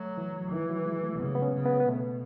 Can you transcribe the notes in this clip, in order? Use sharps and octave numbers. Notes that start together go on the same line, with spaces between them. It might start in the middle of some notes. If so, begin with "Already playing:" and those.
Already playing: F#3 A3
E3
D#3 E3
F#3
G#3
A3
C#3 B3
B3
C#4
C#3
B3
B3
B2 A3